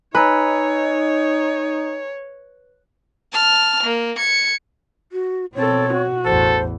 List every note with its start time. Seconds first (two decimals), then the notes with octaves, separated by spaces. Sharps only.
0.15 D#4 B4 C#5 G#5 A#5 E6
3.33 A5 F6
3.84 A#3
4.17 G#6 C#7
5.12 F#4
5.55 B2 C4 A4 C#5
5.94 F#4
6.25 A1 E2 A4 C5